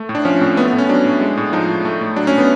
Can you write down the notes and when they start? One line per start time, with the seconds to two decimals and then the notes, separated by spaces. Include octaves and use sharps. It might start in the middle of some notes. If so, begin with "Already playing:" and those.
Already playing: A3
0.09 A2
0.15 D4
0.25 F3 C#4
0.41 A2 C4
0.57 A3 B3
0.68 B3
0.72 A2
0.78 C#4
0.89 F#3 D4
1.05 A2
1.21 G#3
1.37 A2
1.53 F3 D#4
1.68 A2
1.85 A3
2.01 A2
2.16 F#3 D4
2.27 C#4
2.32 A2
2.38 B3